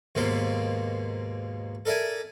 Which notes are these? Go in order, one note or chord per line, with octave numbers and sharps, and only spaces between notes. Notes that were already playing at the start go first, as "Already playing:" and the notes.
D#2 G#2 B2 A#3 C5
A4 A#4 D5 E5 G#5